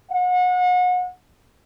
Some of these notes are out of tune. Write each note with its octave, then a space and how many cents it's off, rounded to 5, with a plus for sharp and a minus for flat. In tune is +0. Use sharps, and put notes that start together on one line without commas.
F#5 -35